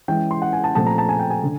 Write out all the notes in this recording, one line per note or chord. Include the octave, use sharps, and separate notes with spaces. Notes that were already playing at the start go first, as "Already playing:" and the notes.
E3 G#3 C#4 G5
C6
F#5
G#5
A5
A#2 F3 A3 C4 A5
A#5
A5
G#5
G5
G#5
D3